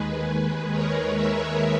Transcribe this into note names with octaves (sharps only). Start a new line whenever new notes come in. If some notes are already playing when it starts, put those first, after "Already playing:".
Already playing: D#2 D#3 G#3 G#4 B4
A#4 C#5
C#5 E5